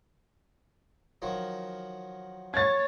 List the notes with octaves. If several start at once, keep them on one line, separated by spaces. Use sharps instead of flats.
D#3 F3 F#3
C#5 G#6 A6